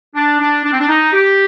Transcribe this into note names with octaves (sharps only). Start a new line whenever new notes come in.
D4
D4
D4
C4
D4
D#4
G4